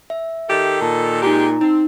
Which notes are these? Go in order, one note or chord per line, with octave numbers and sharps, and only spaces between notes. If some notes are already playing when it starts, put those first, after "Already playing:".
E5
D#3 G4 A4
A#2 A5
G#3 D#4 G4 A#5
C4 D#4